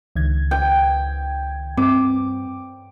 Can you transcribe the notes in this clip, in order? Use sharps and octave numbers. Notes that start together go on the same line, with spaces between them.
C#2 D#3 G#6
G5
G2 C4 D6